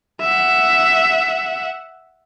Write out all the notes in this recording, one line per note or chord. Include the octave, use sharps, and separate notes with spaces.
E5 F#5